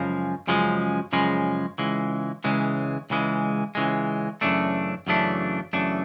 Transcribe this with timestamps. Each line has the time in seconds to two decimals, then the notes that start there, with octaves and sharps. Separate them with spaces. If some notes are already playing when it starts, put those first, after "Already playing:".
Already playing: F#2 C#3 F3 G#3
0.47 F#2 C#3 F3 G#3
1.12 F#2 C#3 F3 G#3
1.78 C#2 C#3 E3 G#3
2.44 C#2 C#3 E3 G#3
3.10 C#2 C#3 E3 G#3
3.75 C#2 C#3 E3 G#3
4.41 F#2 C#3 E3 A3 D4
5.07 F#2 C#3 E3 A3 D4
5.73 F#2 C#3 E3 A3 D4